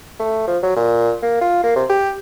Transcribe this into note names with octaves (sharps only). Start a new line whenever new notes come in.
A3
F3
F#3
A#2
A#3
F4
A#3
C3
G4